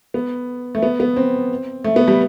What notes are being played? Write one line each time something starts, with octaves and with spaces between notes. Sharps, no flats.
B3
A3
B3
B3
C4
A3
B3
G3